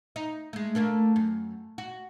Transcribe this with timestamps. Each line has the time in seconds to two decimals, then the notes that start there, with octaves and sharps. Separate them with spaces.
0.16 D#4
0.53 G#3 A3
0.75 A3 A#3 D4
1.16 F#2
1.78 F#4